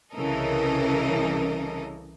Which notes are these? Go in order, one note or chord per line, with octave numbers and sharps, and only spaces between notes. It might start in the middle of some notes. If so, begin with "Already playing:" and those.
C2 C#3 E3 A4 A#4 D#5